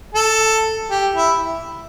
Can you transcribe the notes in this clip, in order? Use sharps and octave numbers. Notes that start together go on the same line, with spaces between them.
A4
G4
E4